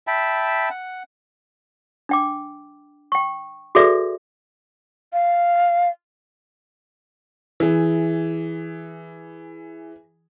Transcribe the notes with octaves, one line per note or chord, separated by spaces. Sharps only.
E5 G5 A5 B5
F#5
D4 G5 D6
G5 C#6
F#4 G#4 A4 B4 D5 E5
F5
E3 G#4